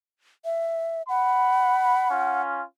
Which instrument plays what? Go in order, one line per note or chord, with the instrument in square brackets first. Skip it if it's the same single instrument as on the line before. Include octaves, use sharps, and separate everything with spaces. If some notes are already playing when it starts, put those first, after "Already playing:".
[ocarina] E5
[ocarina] F#5 [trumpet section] B5
[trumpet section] C#4 F4